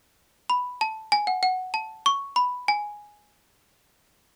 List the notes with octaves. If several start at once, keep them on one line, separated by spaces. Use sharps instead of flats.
B5
A5
G#5
F#5
F#5
A5
C#6
B5
G#5